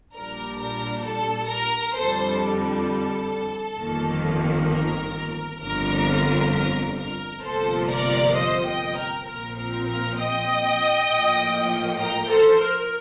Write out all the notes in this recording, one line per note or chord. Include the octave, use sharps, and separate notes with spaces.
A#1 A#2 G3 D4 A#4
A#4
A4
A#4
F2 D3 G3 A4 C5
A4
A4
G1 F2 D#3 A#3
A#4
G1 F2 D3 A#4
A#4
A#4
G1 F2 C3 F3 A#3 A4 C5
A#4 D5
C5 D#5
D#5 G5
A#4
A#1 A#2 F3 C4 A#4
A#4
A#4
D#5 G5
A2 F3 A#3
G5 A#5
A4 C5
A#4